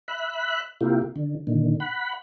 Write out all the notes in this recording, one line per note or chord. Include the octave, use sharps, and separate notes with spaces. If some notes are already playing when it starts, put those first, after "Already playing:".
E5 B5 F#6
C3 A#3 E4 F4 G4
D3
A#2 D3 D#3
F#5 B5